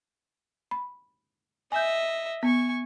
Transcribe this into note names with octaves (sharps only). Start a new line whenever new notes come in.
B5
D#5 E5 G#5 G6
B3 G#5 C#6